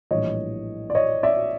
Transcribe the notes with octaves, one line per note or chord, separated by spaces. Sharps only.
A#1 A2 E3 G3 C#5 D#5
D5
C#5 D#5
D5 E5